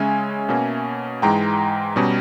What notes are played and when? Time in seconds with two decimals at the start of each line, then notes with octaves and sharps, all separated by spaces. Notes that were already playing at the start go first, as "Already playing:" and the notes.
Already playing: C#3 G#3 C#4 E5 G#5
0.49 B2 A#3 C#4
1.22 G#2 E3 G#3 G5 A#5
1.96 B2 G3 C#4